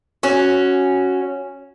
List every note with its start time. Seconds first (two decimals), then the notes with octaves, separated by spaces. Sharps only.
0.23 C#4 F#4